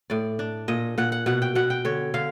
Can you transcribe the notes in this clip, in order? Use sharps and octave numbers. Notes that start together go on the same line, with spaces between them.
A2 D5
D4
A#2 D#5
A#2 F#5
F#5
B2 F#5
G5
B2 F#5
G5
D3 C#5
D3 F5